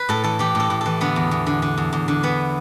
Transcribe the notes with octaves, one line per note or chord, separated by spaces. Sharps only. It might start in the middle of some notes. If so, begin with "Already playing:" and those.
Already playing: B4
A2 A4
E3 A4
E3 G4
A2 A4
A2
E3 A4
D3 B3
E2
E2
D3
D3
E2
E2
D3
E3 B3